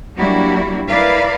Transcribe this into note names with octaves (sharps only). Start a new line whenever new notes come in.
F#3 G3 A#3 D4 E4 F#4
E4 A#4 B4 D5 F5